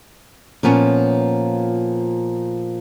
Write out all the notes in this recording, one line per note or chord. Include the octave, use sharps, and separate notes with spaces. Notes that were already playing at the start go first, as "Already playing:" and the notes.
A#2 F3 B3 C#4